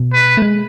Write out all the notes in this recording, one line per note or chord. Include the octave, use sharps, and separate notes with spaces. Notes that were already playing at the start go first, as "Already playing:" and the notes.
Already playing: B2
B4
A3
G#3